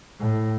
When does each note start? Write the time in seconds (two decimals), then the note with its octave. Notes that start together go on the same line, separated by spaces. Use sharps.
0.20 A2